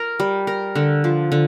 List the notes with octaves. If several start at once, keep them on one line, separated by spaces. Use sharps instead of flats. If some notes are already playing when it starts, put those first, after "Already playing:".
Already playing: A#4
G3
A#4
D3
F3
D3